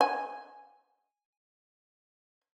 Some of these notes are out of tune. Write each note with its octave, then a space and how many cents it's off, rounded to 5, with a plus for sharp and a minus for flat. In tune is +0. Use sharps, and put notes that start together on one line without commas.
G#5 -5